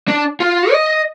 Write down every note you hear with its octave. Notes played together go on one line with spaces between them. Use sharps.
D4
F4
D#5